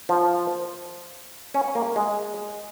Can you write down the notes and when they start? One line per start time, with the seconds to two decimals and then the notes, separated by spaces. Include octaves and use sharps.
0.09 F3
1.54 C#4
1.75 A#3
1.96 G#3